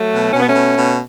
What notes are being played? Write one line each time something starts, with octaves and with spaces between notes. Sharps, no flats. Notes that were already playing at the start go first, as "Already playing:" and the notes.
Already playing: F#3 A3
B2
B2 C#4
B3
A3 C#4
B2
B2